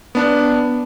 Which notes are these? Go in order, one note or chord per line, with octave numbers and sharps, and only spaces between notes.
B3 D4